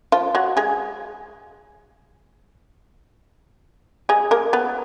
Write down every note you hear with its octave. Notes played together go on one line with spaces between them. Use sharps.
F3 F4
F#3 F#4
G#3 G#4
G#3 G#4
A#3 A#4
B3 B4